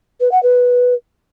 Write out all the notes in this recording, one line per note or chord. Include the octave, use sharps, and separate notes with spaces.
B4
F#5
B4